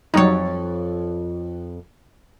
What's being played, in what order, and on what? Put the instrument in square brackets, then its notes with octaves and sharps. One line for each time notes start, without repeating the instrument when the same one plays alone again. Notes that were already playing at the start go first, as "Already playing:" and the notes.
[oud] F2 C#5 [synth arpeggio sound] F#3 G3 D#4